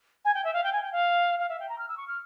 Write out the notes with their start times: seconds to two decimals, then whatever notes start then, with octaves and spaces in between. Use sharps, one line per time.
0.25 G#5
0.34 G5
0.44 E5
0.54 F5
0.64 G5
0.72 G#5
0.82 G5
0.92 F5
1.39 F5
1.49 E5
1.60 G5
1.69 A#5
1.78 F6
1.88 E6
1.97 C#6
2.07 F6